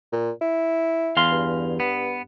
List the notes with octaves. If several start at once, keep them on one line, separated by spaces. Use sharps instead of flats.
A#2
E4
E2 F5 C6
G2
B3